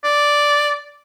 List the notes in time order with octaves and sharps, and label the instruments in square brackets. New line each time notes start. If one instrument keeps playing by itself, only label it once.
[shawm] D5